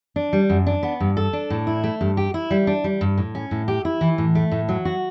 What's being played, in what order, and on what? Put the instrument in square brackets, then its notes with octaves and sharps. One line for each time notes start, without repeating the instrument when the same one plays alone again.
[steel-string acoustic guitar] D4
G3
F#2
D4
B3
G2
A4
D4
A2
E4
A3
G2
G4
E4
G3
D4
G3
G2
A2
C#4
A2
G4
E4
E3
A2
A3
A2
F#3
F#4